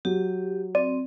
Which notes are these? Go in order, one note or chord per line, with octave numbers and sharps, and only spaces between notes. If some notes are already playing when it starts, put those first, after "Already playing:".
F#3 G4
C4 D5